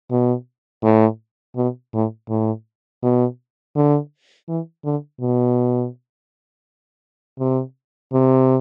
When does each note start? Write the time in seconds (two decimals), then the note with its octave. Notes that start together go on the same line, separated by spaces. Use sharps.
0.11 B2
0.84 A2
1.56 B2
1.94 A2
2.29 A2
3.03 B2
3.76 D3
4.49 E3
4.85 D3
5.21 B2
7.39 C3
8.13 C3